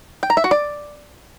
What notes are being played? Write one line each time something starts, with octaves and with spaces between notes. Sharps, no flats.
G5
A#5
E5
F#4
D5